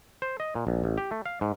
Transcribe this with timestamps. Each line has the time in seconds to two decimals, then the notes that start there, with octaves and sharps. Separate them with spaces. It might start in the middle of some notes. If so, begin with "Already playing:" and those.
0.22 C5
0.40 D#5
0.55 A#2
0.67 A#1
0.84 A1
0.98 G4
1.11 A3
1.26 F5
1.41 G#2